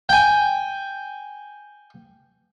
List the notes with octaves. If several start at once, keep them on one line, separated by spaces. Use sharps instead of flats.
G5 G#5